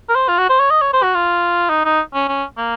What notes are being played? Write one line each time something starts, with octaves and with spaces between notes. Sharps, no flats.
A#4
C5
F4
F#4
C5
C#5
D#5
C#5
C5
F#4
F4
D#4
D#4
C#4
C#4
A#3